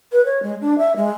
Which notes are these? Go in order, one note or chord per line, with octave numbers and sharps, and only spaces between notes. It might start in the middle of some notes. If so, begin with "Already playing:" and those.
B4
C#5
G#3
D4
E5
G#3